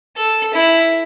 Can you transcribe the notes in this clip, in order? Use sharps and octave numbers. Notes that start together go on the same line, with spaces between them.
A4
E4